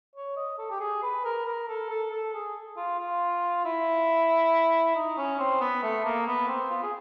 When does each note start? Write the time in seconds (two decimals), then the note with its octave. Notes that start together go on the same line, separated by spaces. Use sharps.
0.15 C#5
0.37 D#5
0.58 A4
0.70 G4
0.80 G#4
1.03 B4
1.25 A#4
1.46 A#4
1.69 A4
1.90 A4
2.11 A4
2.34 G#4
2.77 F4
2.99 F4
3.65 E4
4.96 D#4
5.18 C#4
5.39 C4
5.61 B3
5.83 A3
6.04 A#3
6.26 B3
6.48 C4
6.71 F4
6.83 G#4